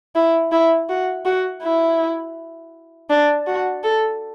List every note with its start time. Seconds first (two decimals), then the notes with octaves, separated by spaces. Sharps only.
0.15 E4
0.52 E4
0.89 F#4
1.25 F#4
1.63 E4
3.10 D4
3.47 F#4
3.84 A4